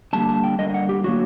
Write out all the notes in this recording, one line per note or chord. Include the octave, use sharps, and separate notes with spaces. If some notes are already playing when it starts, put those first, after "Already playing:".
D3 G3 A#3 A5
A5
G5
D3 G3 A#3 D#5
D#5
F#5
G4
D3 F#3 A#3 F#4